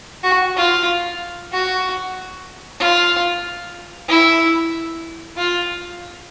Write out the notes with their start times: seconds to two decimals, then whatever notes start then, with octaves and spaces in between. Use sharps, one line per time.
0.24 F#4
0.57 F4
1.53 F#4
2.80 F4
4.09 E4
5.37 F4